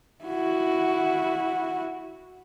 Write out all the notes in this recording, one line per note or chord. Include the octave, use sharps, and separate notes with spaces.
E4 F#4